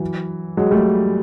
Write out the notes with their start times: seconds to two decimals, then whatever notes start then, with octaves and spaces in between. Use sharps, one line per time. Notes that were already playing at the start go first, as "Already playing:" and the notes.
Already playing: E3 F#3
0.57 F#3 G#3
0.71 G3 A3